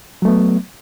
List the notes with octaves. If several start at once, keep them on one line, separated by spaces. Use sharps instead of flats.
F#3 A3 B3